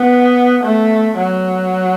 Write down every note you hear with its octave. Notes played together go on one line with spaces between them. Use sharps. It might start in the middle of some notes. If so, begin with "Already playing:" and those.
Already playing: B3
A3
F#3